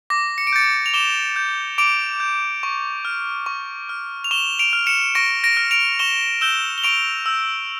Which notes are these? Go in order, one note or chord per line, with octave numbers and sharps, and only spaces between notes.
D6 A#6
C#7
D7
G6 A6 C#7
F7
D6 E7 G7
G6
D6 D7 F7
G6
C#6
F6
C#6
F6
F7
C#6 E7 G7
D7 F7
F6
C#7 E7
C#6 A#6 D7
A#6 D7
F6
D7 F7
C#6 E7 G7
E6 G6 E7 G7
G7
C#6 D7 F7
E6 G6